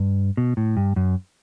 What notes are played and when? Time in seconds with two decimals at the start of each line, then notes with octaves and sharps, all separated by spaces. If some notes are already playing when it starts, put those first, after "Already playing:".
Already playing: G2
0.37 B2
0.57 A2
0.77 G2
0.96 F#2